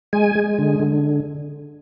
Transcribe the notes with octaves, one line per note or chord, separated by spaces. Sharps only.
G#3 G#5
G#3
D3
D3